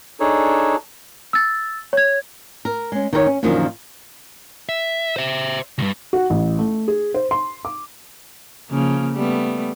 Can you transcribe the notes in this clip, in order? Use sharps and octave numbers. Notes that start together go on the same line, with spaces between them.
D4 D#4 G#4 A4 C#5
E6 A6
C#5 G#6
A#4
G#3 C#4
D#3 D#4 A#4 C#5
C#4
F#2 A#2 D3 D#3 F3
E5
C5 E5
C#2 G2
F#4
A1
A3
G#4
C5
C6
D6
C#3 F3 A#3
G3 A3 B3